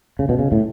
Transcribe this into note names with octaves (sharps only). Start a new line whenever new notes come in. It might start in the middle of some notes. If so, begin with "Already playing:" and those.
C#3
B2
C#3
A2